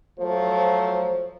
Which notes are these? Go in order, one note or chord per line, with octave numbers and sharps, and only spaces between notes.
F3 F#3 A3 C5